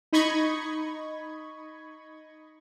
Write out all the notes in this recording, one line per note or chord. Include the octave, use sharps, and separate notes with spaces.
D#4 D#5 B5 C#6 G#6